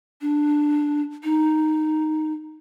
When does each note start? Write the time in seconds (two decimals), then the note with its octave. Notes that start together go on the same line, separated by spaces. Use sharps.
0.21 D4
1.24 D#4